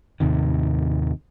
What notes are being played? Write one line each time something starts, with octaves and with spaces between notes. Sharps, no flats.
D#2 A2 C3 D#3